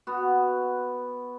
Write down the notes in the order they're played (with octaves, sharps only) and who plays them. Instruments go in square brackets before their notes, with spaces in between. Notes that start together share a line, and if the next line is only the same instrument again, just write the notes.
[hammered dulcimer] B3 F#4